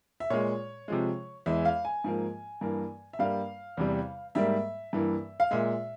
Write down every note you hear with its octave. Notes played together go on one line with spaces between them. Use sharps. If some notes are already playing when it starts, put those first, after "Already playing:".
E5
A#2 G#3 C#5
C3 F3 G#3
E2 E3 G#3 E5
F5
G#5
G#2 F3 A#3
G2 E3 A#3
E5
G2 G3 A#3 F5
E2 C3 G3
G#2 G3 A#3 E5
G2 E3 A#3
F5
A#2 G#3 E5